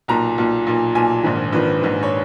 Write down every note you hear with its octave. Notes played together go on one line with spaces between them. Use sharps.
B1 A#2 A#5
B1 A#2
B1 A#2
B1 A#2 G#5
A#1 G#2 D#3
A#1 G#2 D#3 B4
A#1 G#2 D#3
C#5